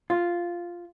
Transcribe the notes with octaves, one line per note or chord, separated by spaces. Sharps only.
F4